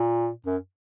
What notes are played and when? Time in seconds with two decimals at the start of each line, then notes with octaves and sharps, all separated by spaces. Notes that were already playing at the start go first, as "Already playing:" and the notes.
Already playing: A#2
0.46 F#2